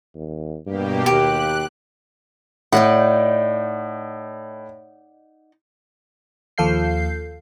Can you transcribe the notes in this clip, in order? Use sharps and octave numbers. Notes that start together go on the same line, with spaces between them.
D#2
G2 B2 A#3 G4
D#2 G4 F#6
A2 D#4 D5 F#5
D#2 F3 A4 F5 G6 C7